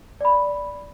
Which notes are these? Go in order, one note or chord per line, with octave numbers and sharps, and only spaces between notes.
D5 B5